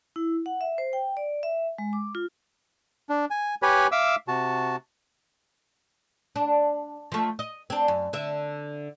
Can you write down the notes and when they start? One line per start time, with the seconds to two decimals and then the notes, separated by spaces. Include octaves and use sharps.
0.16 E4
0.46 F#5
0.61 E5
0.78 C5
0.93 G5
1.17 D5
1.43 E5
1.78 G#3
1.93 D6
2.15 F4
3.10 D4
3.30 G#5
3.62 G4 B4 C#5 G#5 B5
3.92 E5 F5 D6 E6
4.28 C3 F#4 A5
6.36 D4
7.12 F3 A3
7.39 D#5
7.70 C4 D4
7.88 F#2
8.13 D3 E5